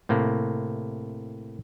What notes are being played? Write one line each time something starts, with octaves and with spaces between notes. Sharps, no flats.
A2 C3 A#3